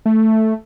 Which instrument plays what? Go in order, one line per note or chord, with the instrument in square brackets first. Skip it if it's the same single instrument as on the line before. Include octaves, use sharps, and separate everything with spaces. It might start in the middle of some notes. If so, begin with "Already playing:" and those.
[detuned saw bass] A3